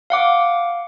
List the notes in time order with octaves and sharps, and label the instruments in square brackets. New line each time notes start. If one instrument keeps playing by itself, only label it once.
[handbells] F5 F#5 D6